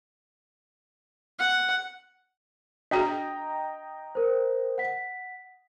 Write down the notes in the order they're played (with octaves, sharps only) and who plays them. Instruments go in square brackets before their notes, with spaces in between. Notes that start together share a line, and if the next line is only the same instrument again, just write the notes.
[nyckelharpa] F#5
[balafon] D4 F#4 G#4 [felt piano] D#5 G5 A#5
[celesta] A#4 C5
F#5 B6